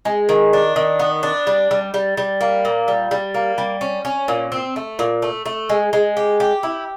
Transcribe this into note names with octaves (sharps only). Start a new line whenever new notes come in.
G#3
D#3
D4
D#3
B3
D4
G3
G3
G3
G3
A#3
A#2
G3
G3
A#3
G3
C#4
C#4
A#2
C4
A3
A#2
A3
A3
G#3
G#3
G4
G4
E4